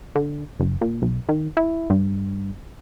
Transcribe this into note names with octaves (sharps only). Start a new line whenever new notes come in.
D3
F#1
A#2
B1
D#3
E4
G2